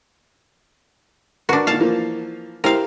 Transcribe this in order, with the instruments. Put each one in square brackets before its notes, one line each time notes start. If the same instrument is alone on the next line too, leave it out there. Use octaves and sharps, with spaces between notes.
[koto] D4 F#4 [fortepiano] A#4 B4
[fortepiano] A#2 D#3 [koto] F5 A5
[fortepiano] E3 F3 A#3
[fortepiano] E4 G4 C5 [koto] A#4 F5